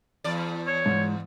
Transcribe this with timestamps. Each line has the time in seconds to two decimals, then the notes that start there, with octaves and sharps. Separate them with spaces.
0.24 E2 D5
0.67 C#5
0.86 G#2